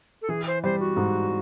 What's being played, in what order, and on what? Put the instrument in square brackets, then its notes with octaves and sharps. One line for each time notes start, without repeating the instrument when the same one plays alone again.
[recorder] A4
[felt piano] E3 [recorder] G#4
[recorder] C5
[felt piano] G3 [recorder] C5
[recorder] F#4
[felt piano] G#2